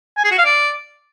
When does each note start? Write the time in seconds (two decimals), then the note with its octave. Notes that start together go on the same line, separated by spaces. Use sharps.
0.17 G#5
0.24 G#4
0.31 F#4
0.38 F5
0.45 D5